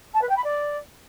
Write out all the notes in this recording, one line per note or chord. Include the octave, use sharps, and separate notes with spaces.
A5
B4
G5
B5
D5